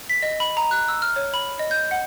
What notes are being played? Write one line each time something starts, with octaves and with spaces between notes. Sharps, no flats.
B6
D#5
B5
A#5
F#6
E6
F6
C#5
B5
D#5
G6
F#5